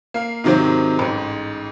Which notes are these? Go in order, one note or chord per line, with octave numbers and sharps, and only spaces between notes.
A#3 F5
G#2 C3 D#3 F#3 C4
A1 G#2